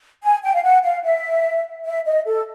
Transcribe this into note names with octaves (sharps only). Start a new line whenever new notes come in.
G#5
G5
F5
F#5
F5
E5
E5
D#5
A4